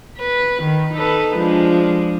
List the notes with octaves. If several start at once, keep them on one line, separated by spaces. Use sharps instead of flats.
B4
D#3
D#4 A4 B4
F3 G#3 D4